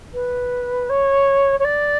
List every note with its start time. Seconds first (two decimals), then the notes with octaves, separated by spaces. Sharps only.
0.14 B4
0.89 C#5
1.59 C#5
1.64 D5